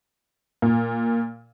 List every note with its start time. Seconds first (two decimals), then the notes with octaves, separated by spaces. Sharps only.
0.62 A#2